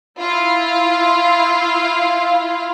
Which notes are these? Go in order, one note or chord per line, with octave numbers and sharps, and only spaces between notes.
E4 F4 F5